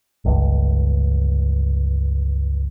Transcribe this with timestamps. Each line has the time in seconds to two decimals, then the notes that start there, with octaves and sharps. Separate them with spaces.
0.25 G1 C#2